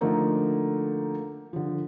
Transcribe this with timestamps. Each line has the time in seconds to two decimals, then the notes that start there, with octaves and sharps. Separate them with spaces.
0.01 D3 F3 A3 A#3 D#4
1.53 D3 F3